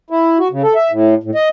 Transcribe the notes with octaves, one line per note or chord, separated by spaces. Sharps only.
E4
F#4
C#3
A4
E5
A2
A2
D#5